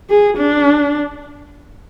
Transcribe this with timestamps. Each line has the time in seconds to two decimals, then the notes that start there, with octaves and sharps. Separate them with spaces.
0.10 G#4
0.37 D4